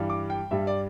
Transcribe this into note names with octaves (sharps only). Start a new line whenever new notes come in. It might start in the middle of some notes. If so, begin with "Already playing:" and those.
Already playing: G2 E3 G3
D6
G5
G2 G3 E5
D5